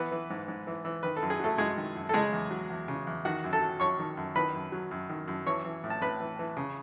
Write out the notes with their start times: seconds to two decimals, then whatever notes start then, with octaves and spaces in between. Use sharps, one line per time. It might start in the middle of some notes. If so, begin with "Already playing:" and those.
Already playing: E3 B3 B4
0.12 E3
0.30 G#2
0.48 G#2
0.67 E3
0.85 E3
1.03 D#3 B4
1.16 A4
1.22 F#2
1.30 G#4
1.40 F#3 A3 A4
1.58 F#2 G#3 G#4
1.77 D#3
1.96 F#2
2.09 A4
2.14 C#3 G#3 G#4
2.33 E2
2.51 F#3
2.70 E2
2.88 C#3
3.07 E2
3.25 D#3 F#4 F#5
3.44 F#2
3.53 A4 A5
3.61 F#3
3.80 F#2 C#5 C#6
3.99 D#3
4.17 F#2
4.35 D#3 B4 B5
4.55 F#2
4.72 F#3
4.91 F#2
5.09 D#3
5.28 F#2
5.46 E3 C#5 C#6
5.65 E3
5.84 A2
5.90 A5
6.01 A2 B4 B5
6.20 E3
6.39 E3
6.57 C#3